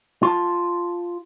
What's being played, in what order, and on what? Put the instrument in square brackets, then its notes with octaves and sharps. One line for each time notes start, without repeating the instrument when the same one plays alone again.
[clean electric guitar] F4 A5